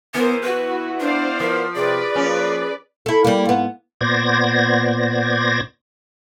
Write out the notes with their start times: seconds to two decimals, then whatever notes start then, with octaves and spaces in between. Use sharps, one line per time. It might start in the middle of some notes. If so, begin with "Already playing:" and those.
0.14 E3 B3 A#4 C5
0.43 B3 E4 F#4 B4
1.00 D4 C5 D5 F5
1.40 F3 A#4
1.76 C3 G#4 B4 D5
2.16 F3 A#3 C#4
3.06 E4 A4
3.24 G3 A#3
3.45 G#2 B3
4.01 A#2 B3 C5 D5 G#6 A#6